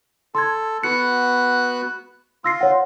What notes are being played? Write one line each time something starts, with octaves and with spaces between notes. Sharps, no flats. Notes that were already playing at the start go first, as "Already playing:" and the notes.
A4 C6 G#6
B3 F#4 F#6 C#7
F4 E6 A#6 C7
C#5 F#5